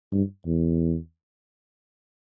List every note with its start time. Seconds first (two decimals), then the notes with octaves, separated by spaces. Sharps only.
0.12 G2
0.46 E2